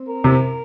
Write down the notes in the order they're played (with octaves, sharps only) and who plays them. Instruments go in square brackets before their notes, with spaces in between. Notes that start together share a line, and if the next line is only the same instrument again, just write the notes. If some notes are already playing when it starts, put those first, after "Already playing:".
Already playing: [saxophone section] C4
A#4
[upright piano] C3